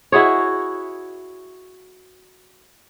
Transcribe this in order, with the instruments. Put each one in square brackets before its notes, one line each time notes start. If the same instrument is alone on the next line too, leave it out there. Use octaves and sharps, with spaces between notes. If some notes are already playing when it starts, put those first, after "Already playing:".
[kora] E4 F#4 G#4 C#5